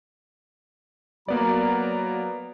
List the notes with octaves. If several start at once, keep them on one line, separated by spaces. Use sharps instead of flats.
F#3 A#3 B3 D5 A#5